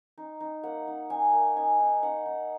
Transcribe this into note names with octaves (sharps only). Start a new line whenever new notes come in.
D#4
D#4
A#3 F#5
D#4
D#4 G#5
A#3
D#4 G#5
D#4
D#4 F#5
D#4